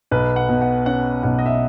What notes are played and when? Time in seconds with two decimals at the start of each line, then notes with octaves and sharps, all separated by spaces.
0.11 B1 B4
0.36 F#5
0.49 B2
0.62 F#5
0.86 C#4 F#5
1.23 B1 F#5
1.39 D#5
1.46 E5